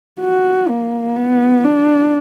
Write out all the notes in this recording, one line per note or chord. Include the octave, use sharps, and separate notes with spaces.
F#4
A#3
B3
D4